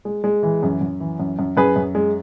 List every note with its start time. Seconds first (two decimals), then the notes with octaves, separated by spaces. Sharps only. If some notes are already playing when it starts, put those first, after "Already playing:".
0.05 G#3
0.24 G#3
0.43 E3
0.63 F#2
0.81 F#2
1.00 E3
1.20 F#2
1.39 F#2
1.57 F#2 G#4 B4
1.76 F#2
1.95 G#3